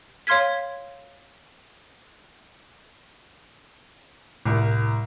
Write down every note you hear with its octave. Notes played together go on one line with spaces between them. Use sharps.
C#5 F5 C6 F6 G#6 B6
C2 A2 A#4